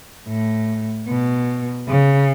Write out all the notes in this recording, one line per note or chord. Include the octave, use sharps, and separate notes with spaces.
A2
B2
C#3